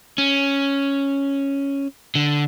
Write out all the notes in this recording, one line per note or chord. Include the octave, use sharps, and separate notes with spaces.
C#4
D3